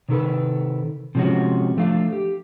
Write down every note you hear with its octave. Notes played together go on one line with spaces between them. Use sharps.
C3 D#3 A4 B4
C3 F3 G#3 C4 C#4 F#4
F3 A3 D4 F5
G4